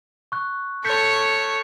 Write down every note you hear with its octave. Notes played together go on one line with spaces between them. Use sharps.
C#6 F#6
A4 C#5 G6 B6 C#7